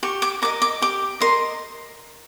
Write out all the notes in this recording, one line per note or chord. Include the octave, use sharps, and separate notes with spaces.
G4 C#6
D6
A#4 D#5 D6
D6
G4 D6
A#4 D#5 C6